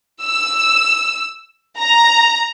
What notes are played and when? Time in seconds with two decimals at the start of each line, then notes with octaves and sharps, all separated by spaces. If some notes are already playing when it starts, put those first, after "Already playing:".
0.23 E6
1.78 A#5